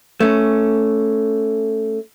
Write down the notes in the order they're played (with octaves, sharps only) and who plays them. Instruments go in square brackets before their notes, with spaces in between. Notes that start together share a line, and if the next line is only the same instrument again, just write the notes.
[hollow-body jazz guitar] A3 C#4